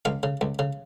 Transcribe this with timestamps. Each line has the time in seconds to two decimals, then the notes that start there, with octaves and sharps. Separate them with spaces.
0.05 C#2 F5
0.23 C#3
0.41 C#2
0.59 C#3